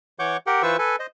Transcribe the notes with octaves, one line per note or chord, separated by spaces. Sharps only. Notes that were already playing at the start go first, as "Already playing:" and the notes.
E3 C#5 F#5 C#6 D6 G6
G4 A#4 F#5 G5
E3 F4 B4 C5 C#6 E6
A4 B4 G#5
C5 D#5